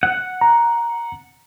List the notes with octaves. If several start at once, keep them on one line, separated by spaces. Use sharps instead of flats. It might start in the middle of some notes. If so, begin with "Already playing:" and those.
F#5
A#5